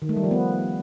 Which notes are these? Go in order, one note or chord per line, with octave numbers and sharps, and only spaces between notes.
D#3
A3
G3
F3
B3